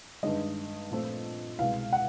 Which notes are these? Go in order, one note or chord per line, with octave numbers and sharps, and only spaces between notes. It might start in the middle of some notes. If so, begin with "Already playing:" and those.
G2 D#3 G#3 D#5
A#2 F3 A3 C4
C2 B2 G#3 F5
F#5